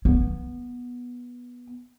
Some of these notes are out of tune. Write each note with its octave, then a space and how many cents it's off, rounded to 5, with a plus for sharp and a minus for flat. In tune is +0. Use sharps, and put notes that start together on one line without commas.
B3 -15